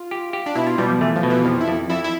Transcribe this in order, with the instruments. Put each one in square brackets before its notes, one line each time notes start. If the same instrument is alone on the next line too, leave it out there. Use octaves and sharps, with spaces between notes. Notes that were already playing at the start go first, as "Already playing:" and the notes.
Already playing: [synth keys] F4
[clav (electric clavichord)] G4
G4
[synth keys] D4
[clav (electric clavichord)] B2 [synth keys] E4
[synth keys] F4
[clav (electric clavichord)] B2 [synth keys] G3
[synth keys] F3
[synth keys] E3 [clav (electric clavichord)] A3
[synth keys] F3
[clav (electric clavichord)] B2
[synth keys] E3
[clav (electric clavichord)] F2 [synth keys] F3
[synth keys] E4
[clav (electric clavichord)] F2
[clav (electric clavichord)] F2 [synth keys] E4
[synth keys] E4